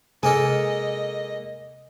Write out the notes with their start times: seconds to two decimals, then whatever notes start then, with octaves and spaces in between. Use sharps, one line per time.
0.23 C3 G#3 A#3 A4 D#5 G#5